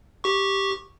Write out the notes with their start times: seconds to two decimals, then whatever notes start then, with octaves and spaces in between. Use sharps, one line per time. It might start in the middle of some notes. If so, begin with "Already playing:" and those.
0.24 G4 C#6